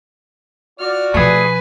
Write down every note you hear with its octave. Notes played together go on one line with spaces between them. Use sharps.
F4 F#4 D5 F6
B2 F3 A3 G#4 B4 G#5